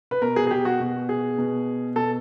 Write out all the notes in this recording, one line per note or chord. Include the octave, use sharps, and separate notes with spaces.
B4
B2 A#4
G#4
G#4
G4
F#4
B2
G#4
B2
B2 A4